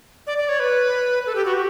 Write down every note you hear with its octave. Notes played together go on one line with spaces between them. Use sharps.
D5
D5
C#5
B4
A4
G4
F#4
G4